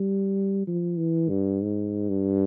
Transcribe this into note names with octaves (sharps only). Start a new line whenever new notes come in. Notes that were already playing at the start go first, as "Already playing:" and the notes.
Already playing: G3
F3
E3
G2
G#2
G2